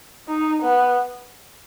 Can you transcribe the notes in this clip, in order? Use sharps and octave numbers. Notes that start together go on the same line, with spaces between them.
D#4
B3